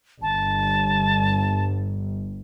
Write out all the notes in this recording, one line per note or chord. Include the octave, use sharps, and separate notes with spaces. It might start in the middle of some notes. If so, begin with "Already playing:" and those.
G1 A5